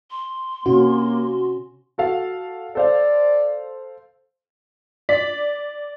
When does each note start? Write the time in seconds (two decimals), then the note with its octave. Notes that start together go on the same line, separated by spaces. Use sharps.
0.11 C6
0.66 C3 A#3 C#4 F#4
1.98 F#4 A4 F5
2.75 A4 C5 D5 F5
5.09 D5 B6